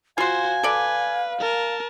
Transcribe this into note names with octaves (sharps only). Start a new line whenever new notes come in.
F4 F#4 C5 F5 G#5 C6
A4 B4 D5
A#4 A5